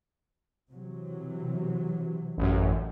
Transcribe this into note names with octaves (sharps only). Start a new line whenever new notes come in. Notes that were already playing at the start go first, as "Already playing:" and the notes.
C3 E3 F#3
A1 F#2